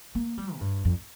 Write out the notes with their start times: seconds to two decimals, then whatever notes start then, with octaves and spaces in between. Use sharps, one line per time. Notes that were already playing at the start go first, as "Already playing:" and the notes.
0.15 A#3
0.38 G3
0.55 A#2
0.61 G2
0.85 F2